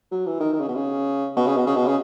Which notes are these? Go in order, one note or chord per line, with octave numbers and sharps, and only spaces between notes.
F#3
E3
D#3
D#3
C#3
B2
C#3
B2
C#3
B2
C#3
B2
C#3